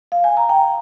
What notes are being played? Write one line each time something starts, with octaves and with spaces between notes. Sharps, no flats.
F5
G#5
A#5
G5